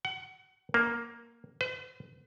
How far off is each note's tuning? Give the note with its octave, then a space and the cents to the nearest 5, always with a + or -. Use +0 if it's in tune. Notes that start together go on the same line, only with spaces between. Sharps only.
F#5 +30
A#3 +5
B4 +45